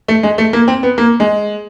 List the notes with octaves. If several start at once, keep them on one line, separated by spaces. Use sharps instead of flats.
A3
G#3
A3
A#3
C4
B3
A#3
G#3